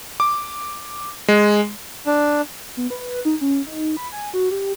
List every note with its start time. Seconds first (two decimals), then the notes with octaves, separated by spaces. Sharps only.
0.20 D6
1.28 G#3
2.06 D4
2.77 B3
2.90 B4
3.25 D#4
3.41 C#4
3.67 D#4
3.97 B5
4.12 G#5
4.34 F#4
4.51 G4